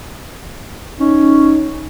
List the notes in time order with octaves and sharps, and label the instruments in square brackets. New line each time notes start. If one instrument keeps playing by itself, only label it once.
[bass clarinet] C#4 [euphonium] D#4